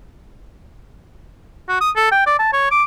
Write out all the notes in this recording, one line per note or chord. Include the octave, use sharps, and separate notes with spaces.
F#4
D#6
A4
G5
D5
A5
C#5
D6